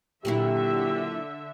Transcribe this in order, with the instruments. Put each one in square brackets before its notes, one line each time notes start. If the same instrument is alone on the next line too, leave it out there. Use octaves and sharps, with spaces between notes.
[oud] A#2 F#3 E4 [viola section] D3 E5 [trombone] G4